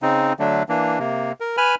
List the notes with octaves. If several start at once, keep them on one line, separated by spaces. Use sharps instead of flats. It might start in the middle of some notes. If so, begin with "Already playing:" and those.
C#3 C4 D#4
D3 F#3 A3 D4
E3 A#3 D4
C3 A#3
A#4
B4 G#5 B5 F6